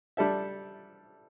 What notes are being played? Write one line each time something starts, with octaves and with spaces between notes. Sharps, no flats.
G3 D4 A4 E5